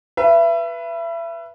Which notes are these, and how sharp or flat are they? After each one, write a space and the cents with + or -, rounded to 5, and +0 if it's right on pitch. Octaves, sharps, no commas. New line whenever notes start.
B4 -10 E5 +30